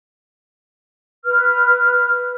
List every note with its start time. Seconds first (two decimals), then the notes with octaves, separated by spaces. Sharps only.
1.25 B4 F6